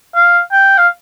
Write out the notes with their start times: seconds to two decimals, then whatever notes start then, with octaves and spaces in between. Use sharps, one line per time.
0.15 F5
0.52 G5
0.78 F5